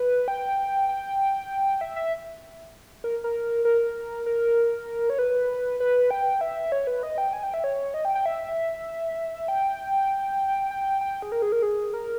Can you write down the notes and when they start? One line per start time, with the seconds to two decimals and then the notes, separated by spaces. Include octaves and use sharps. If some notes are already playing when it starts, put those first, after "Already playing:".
Already playing: B4
0.28 G5
0.89 G5
1.81 E5
1.96 E5
3.04 A#4
3.24 A#4
3.65 A#4
4.26 A#4
5.10 C#5
5.19 B4
5.80 B4
6.11 G5
6.41 E5
6.72 C#5
6.87 B4
7.03 D#5
7.18 G5
7.33 G#5
7.43 G5
7.54 E5
7.64 C#5
7.94 D#5
8.05 G5
8.15 G5
8.26 E5
9.48 G5
10.71 G5
11.01 G5
11.22 G#4
11.32 A#4
11.42 G#4
11.52 A#4
11.62 G#4
11.94 A#4